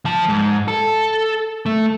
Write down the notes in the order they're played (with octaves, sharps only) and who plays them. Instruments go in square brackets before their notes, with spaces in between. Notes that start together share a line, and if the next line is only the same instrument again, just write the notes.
[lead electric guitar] F3 A5
G#2
A4
A3